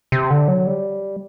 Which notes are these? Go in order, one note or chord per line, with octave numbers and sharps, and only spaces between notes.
C3
D3
F#3
G3